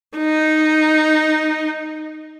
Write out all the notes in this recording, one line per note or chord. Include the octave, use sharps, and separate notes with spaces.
D#4